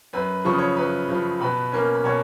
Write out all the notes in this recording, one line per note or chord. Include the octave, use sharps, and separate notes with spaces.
F#2 B4 B5
C#3 F3 C#6
D#6
C#5 C#6
F#2 B4 B5
C#3 F3
B2 B4 B5
A#3 C#4
B5
B2 C#5 C#6